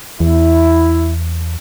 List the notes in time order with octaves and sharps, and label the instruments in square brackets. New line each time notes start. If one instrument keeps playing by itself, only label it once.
[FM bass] E2 [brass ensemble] E4